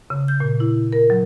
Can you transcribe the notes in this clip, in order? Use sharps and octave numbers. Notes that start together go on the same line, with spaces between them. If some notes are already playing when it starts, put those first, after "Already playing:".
C#3
G6
A#2
E4
A#4
F#3